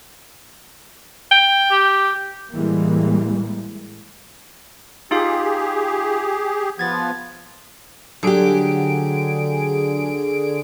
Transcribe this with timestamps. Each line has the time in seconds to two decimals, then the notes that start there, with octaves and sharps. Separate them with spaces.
1.31 G5
1.71 G4
2.53 A2 E3 G3 G#3 A#3
5.11 D#4 F4 G4 G#4 F5
6.79 F3 B3 G#6 A6
8.23 D3 F#3 G4 G#4 D7